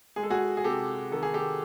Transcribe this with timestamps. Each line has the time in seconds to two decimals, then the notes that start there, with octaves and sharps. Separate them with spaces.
0.16 G#3 G#4
0.23 A4
0.30 F#4 G#4
0.57 G#4
0.64 C3 G4 A4
1.11 D#3 A4
1.23 G#4
1.34 G4 A4